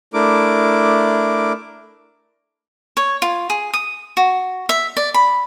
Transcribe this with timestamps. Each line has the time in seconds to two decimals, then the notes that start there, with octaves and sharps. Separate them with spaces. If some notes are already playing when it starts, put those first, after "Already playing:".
0.14 A3 D4 E4 A#4 D6
2.97 C#5
3.22 F4
3.50 G#4
3.74 D#6
4.17 F#4
4.69 E5
4.97 D5
5.14 B5